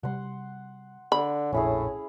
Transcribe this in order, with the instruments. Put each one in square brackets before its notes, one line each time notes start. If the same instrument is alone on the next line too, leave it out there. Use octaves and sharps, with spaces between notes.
[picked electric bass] C3 G3 [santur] F#5 C6
[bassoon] D3 [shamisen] B5
[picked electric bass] F1 A#1 F2 [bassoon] A2 [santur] C#4 E4 G#4